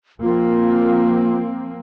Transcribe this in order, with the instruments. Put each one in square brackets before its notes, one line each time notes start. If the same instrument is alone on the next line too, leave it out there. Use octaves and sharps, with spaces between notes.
[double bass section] F3 A#3 C4 [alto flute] F4